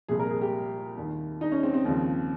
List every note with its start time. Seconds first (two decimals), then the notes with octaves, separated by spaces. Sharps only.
0.08 C2 A#2 F3 G#4
0.19 A#4
0.30 G#4
0.41 G4
0.97 D#2 D#3
1.41 D#4
1.52 C#4
1.63 C4
1.74 C4
1.85 D#2 C#3 F3